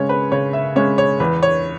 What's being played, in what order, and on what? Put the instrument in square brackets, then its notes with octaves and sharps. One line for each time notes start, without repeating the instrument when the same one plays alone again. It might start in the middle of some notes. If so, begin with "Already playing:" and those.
Already playing: [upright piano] C#3 G#3 C#4 [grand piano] C#5
[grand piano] B4
[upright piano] C#3 [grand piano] C#5
[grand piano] E5
[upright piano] G#3 C#4 [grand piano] C#5
[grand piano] C#5
[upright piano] E2 [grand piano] B4
[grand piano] C#5